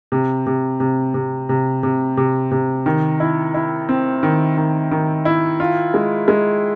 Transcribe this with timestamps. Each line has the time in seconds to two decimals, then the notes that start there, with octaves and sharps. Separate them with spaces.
0.12 C3
0.46 C3
0.80 C3
1.14 C3
1.49 C3
1.83 C3
2.17 C3
2.51 C3
2.86 D#3
3.20 E4
3.54 E4
3.89 C4
4.23 D#3
4.57 D#3
4.91 D#3
5.25 E4
5.60 F4
5.94 G#3
6.28 G#3